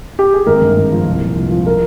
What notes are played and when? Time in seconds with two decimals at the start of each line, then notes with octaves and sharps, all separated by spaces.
0.19 G4
0.33 G#4
0.46 G#1 A#4
0.62 G2
0.77 G#1
0.92 F3
1.06 C2
1.22 A#2
1.36 C2
1.51 F3
1.66 A#4